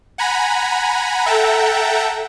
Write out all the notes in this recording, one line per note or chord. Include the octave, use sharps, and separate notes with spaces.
F#5 G#5 A#5 B5
A4 E5 F#5 G5 A5 A#5